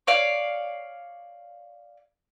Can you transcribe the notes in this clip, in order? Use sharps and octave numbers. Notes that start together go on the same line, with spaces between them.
C#5 D5 F5